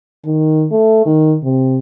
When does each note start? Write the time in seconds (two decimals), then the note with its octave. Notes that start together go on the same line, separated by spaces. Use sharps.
0.25 D#3
0.72 A3
1.06 D#3
1.44 C3